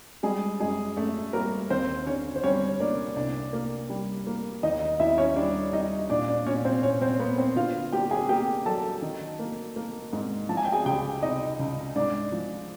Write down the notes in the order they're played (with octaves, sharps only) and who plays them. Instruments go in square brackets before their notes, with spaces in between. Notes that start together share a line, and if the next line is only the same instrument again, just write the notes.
[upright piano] G3 G#3 G#4
F#2 G#3 G#4
F#2 A3 A4
G3 A#3 A#4
D#2 C4 C5
D3 C#4 C#5
C5
G3 C#4 C#5
A#3 D4 D5
C2 D4 D5
A#3
G3
A#3
D#2 D#4 D#5
D#2 E4 E5
C#4 C#5
G3 D4 D5
G3 D#4 D#5
A#2 D4 D5
D4 D5
A#2 C#4 C#5
C4 C5
A#2 C#4 C#5
C4 C5
A#3 B3 B4
C4 C5
D3 F4 F5
A#3 G4 G5
G#4 G#5
A#3 G4 G5
F#3 A4 A5
D#3
A#3
A#3
G#2
F3 A5
G#5
G5
G#4 G#5
C#2 G4 G5
C3 D#4 D#5
C#2
G#2 D4 D5
F3